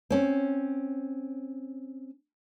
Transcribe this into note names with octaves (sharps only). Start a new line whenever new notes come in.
C4 C#4